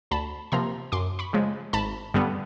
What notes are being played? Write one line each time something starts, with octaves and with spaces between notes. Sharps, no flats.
D2 A5 B5
C3 F3 A#3 A#5 C6
F#2 C6 D6
B5 C#6
C#3 F3 G#3
G#1 A5 B5
G2 D3 G3 B3